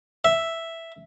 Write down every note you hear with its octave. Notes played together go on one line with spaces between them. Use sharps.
E5